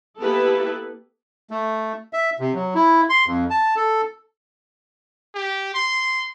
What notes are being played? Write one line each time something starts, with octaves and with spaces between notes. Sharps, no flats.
A#3 B3 E4 G4 A4 B4
A3
E5
C3
F#3
E4
C6
F2
A5
A4
G4
C6